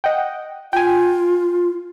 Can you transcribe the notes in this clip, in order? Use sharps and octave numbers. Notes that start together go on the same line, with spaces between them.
D#5 F#5 G5
F4 G5 G#5